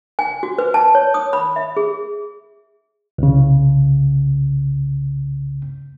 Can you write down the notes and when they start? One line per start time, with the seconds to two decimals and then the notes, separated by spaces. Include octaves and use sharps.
0.19 G#5
0.43 F#4
0.58 B4
0.74 A5
0.95 C#5
1.14 D#6
1.33 B5
1.56 E5
1.77 G#4
3.18 C2 C#3